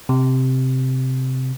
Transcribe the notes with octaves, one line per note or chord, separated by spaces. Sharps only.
C3